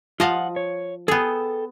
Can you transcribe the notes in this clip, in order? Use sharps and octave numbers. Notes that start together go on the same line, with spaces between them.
F3 F4 D#5 F5 F#5
C#5
B3 G#4 A4 G5